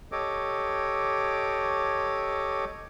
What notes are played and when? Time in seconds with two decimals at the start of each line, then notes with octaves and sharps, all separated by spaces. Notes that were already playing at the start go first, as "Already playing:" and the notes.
0.12 G4 A4 C#5 D#5 D6